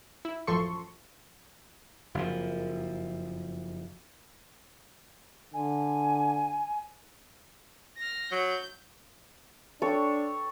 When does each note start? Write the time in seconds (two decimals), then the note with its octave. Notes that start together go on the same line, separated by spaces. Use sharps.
0.25 E4
0.47 A1 F#2 F3 A4 C6 C#6
2.15 F#1 F2 A#2 F3
5.54 D3 G#5
7.98 F6 A#6
8.32 F#3 G6
9.82 D4 A4 C#5 G5